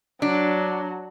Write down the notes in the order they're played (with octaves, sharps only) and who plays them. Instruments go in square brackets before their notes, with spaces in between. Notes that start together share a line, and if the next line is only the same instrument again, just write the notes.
[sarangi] F#3 [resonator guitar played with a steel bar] D4